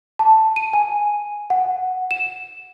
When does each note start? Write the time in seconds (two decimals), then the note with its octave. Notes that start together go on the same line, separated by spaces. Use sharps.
0.19 A5
0.56 D#7
0.73 G#5
1.50 F#5
2.11 E7